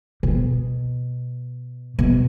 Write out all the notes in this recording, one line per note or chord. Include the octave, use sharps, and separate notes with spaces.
B2
B2